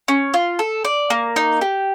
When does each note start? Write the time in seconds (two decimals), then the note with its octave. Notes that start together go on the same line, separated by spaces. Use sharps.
0.08 C#4
0.34 F4
0.59 A4
0.85 D5
1.10 A#3
1.36 D#4
1.61 G4